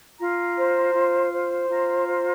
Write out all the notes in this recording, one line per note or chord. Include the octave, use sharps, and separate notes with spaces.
F4 A#5
C5
F4
C5
F4 A#5
C5